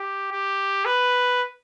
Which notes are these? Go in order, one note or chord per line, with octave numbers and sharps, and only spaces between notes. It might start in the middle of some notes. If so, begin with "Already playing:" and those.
Already playing: G4
G4
B4